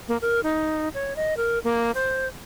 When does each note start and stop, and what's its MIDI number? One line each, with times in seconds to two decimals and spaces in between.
0.08 0.17 58
0.22 0.40 70
0.43 0.89 63
0.94 1.14 73
1.16 1.37 75
1.37 1.59 70
1.64 1.91 58
1.95 2.28 72